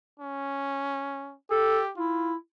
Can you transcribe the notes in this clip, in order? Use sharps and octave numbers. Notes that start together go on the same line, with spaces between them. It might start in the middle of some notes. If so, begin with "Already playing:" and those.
C#4
G4 A4
E4 F4